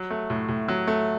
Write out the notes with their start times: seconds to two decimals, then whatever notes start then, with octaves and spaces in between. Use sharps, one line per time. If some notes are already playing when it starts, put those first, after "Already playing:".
Already playing: F#3
0.11 A3
0.30 A2
0.48 A2
0.68 F#3
0.87 A3